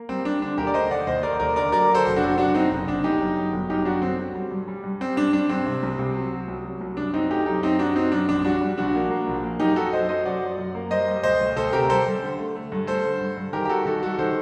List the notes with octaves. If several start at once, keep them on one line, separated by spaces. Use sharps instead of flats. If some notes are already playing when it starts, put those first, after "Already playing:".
Already playing: A#3
G3 C4
G3 D4
D3 D4
D#2 G4 A#4
D5
A3 C5 D#5
D#2 D5 F#5
D#2 C5 D#5
A3 A#4 D5
D#2 A#4 D5
D3 A#4 D5
F#3 A#4 D5
F#3
A4 C5
F#1
D4 F#4
F#2
F#2 D4 F#4
F#2 C4 D#4
F#1
F#1 D4
G1 D#4 G4
F#2
F#3
G1
F#2 D#4 G4
F#3 D4 F#4
G1 C4
F#3
G3
G2
G3
G2
G3 C4
G2 D4
G2 D4
G2 C4
C3
C2
C3
F#3
F#3
C2
F#3
C2
F#2 D4
F#3 C4 D#4
A3 D#4 G4
F#2 D#4 G4
F#3 C4 D#4
F#2 D4 F#4
F#3 C4 D#4
F#2 D4
A#1 D4
G3 D4 F#4
G3
A#1 D4 F#4
A#3
A#3
A#1
A#3
F#2 D#4 G4
F#2 F#4 A4
F#2 C5 D#5
F#3 C5 D#5
F#2 D5 F#5
F#3
F#2
A#3
G3 C5 D#5
G3
D2 C5 D#5
D2
D2 A4 C5
C3 G4 A#4
G3 A4 C5
G3
D3
A3
A3
G2
A3 A4 C5
D3
G2
G2
D#3 G4 A#4
G4
G3 F#4 A4
D#3 F#4 A4
G3 F#4 A4
D#3 A4 C5